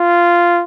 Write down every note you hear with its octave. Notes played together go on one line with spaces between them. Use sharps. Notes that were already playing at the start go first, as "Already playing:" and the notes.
Already playing: F4